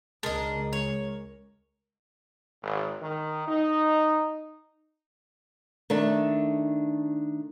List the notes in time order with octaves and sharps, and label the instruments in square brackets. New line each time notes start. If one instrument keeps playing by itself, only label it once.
[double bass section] C#2 [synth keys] G#3 A#4 [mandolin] D4 D#5
[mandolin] C#5
[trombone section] G#1
D#3
D#4
[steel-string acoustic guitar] D#3 A3 D4